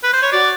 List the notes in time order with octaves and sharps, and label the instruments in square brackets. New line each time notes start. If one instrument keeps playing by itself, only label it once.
[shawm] B4
C5
C#5
[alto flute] F#4 [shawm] D5